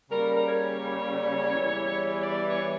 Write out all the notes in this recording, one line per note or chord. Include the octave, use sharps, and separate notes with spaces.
C#3 G3 A#3 A#4
A#4
C#5
E2 E3 G3
D5
C#5